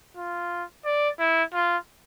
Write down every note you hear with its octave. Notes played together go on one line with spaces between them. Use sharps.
F4
D5
E4
F4